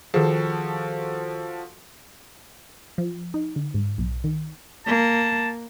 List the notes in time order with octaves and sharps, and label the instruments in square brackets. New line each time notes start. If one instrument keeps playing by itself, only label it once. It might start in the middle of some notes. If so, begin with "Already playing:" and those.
[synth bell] D#3 G#4 [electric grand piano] F3 F#4 A4
[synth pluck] F3
D#4
D3
G#2
B1
D#3
[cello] A#3 [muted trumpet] A5